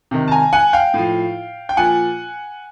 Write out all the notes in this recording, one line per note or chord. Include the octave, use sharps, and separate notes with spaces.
C3 D#3
A5
G#5 A#5
F#5 G#5
F5 G5
A2 F3
G5
A#2 F3 F#5 G#5